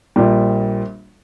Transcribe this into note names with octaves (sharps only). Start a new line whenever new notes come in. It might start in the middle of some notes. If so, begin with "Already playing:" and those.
A#1 A#2 G3